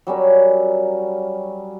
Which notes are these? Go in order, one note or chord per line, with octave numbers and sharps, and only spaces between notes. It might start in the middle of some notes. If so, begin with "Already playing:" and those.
F#3 G3 C#4 A#4